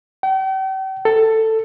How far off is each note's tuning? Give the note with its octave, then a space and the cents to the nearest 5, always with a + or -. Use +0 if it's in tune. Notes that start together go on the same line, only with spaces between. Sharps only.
G5 -40
A4 +10